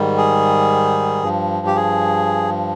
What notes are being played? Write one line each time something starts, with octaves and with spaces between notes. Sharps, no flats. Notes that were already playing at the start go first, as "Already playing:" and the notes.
Already playing: G#2 D#3 G3
G#4
G2 F3
G4
G#4